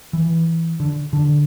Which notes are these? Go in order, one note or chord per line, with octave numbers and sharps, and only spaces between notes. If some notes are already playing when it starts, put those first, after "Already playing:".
E3
D3
D3